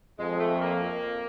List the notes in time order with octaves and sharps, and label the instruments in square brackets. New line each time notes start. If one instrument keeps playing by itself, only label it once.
[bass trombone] F2 [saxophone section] G#3
[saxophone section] A3
A#3